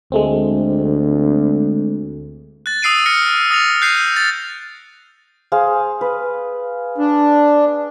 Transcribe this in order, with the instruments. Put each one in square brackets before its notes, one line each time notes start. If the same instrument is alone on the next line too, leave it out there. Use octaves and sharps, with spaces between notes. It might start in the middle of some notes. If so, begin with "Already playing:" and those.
[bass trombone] D2 [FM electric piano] G#3 A3 C4
[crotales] F#6 A6
D#6 E6 C7 D7 D#7
F6 A#6 C#7
D#6 A6 A#6 F7
F#6 G6 C7 D#7
A6
[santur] G#4 C5 F5
B4
[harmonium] D4